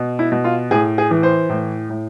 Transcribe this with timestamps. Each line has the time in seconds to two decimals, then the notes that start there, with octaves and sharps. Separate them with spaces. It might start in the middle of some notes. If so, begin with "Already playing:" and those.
Already playing: B2
0.19 E4
0.32 B2
0.44 F4
0.71 A2 G#4
0.98 G#4
1.11 E3
1.23 C5
1.49 A2
1.90 A2